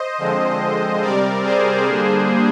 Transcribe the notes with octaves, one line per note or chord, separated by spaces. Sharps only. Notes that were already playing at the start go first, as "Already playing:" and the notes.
Already playing: C5 D#5
D3 F3 G#3 C4
C3 G3 C4 A#4 D5
G#4 C5
D3 G3 A#3 D4